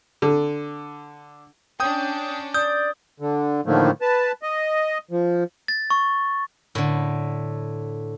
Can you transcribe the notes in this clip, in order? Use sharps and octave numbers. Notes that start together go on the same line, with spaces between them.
D3
C#4 D4 G5 D#6 G6
D5 D#6 G6
D3
A2 D3 D#3 F3 A3 A#3
B4 A5
D#5
F3
A6
C#6
A2 D3